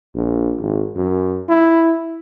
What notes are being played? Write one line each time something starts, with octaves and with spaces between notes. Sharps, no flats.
A#1
G#1
F#2
E4